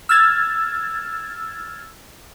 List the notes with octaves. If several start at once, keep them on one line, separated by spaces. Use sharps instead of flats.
E6 F6 G#6 A6